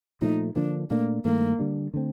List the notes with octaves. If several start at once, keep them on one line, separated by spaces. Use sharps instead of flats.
A#2 F3 A3 D#4
D3 F3 A#3 D4
A#2 A3 A#3 D4
G2 D#3 A3 A#3
D3 G3 D4
D3 A3 C4